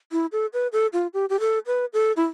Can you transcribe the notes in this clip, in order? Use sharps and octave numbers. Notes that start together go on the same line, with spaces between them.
E4
A4
B4
A4
F4
G4
G4
A4
B4
A4
E4